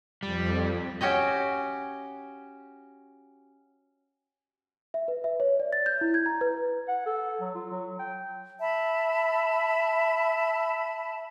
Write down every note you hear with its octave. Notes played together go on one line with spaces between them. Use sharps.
F2 G3
C#4 F#4 G4 D#5
E5
B4
E5
C#5
D5
A6
G6
E4
G#6
A#5
B4
F#5
A4
F#3
F4
F#3
G5
E5 A5 B5